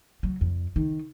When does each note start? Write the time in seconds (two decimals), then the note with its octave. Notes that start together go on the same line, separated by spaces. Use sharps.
0.23 F#3
0.41 F2
0.76 D#3